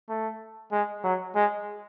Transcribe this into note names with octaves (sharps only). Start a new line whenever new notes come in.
A3
G#3
F#3
G#3